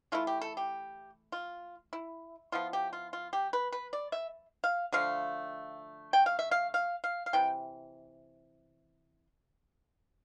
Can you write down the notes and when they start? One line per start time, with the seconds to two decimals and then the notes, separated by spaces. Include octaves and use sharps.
0.12 E3 A3 E4 F4
0.27 G4
0.41 A4
0.57 G4
1.32 F4
1.93 E4
2.52 F3 B3 E4 F4
2.73 G4
2.93 F4
3.13 F4
3.33 G4
3.53 B4
3.72 B4
3.93 D5
4.12 E5
4.64 F5
4.92 D3 F3 A3 F5
6.13 G5
6.26 F5
6.39 E5
6.51 F5
6.74 F5
7.04 F5
7.26 F5
7.33 C3 E3 G5